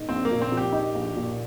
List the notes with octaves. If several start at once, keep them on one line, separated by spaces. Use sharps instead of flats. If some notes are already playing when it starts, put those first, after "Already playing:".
Already playing: A#2 D#4
A#1 C4
A#3
A#2
C4
F3
G4
D#4
A#1
A#2